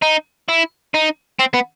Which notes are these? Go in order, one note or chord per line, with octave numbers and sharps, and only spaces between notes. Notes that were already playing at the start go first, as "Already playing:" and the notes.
D#4
E4
D#4
C4
B3